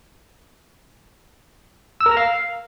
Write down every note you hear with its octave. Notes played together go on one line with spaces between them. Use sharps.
E6
A#4
A#5
F5